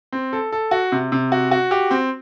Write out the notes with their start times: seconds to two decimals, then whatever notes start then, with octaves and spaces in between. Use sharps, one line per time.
0.12 C4
0.33 A4
0.52 A4
0.71 F#4
0.92 C3
1.12 C3
1.32 F#4
1.51 F#4
1.71 G4
1.91 C4